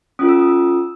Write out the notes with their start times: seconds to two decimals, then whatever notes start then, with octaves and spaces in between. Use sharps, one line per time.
0.19 C#4 F4 A4 D#6
0.29 E6
0.40 D#6
0.49 E6